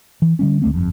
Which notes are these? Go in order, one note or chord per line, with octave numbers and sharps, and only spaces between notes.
E3
D3 G3 C#4
D2 A3 C4
G1 F2